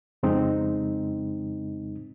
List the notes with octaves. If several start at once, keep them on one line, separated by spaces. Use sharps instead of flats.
F2 C#3 G#3 C4 D#4